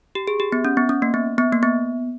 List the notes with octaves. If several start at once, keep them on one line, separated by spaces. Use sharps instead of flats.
G4
G#4
G4
B3
C#4
B3
C#4
A#3
B3
B3
A#3
B3